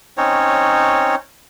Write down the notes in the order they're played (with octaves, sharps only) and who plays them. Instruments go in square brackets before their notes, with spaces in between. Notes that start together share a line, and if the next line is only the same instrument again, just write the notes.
[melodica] C4 C#4 D#4 C#5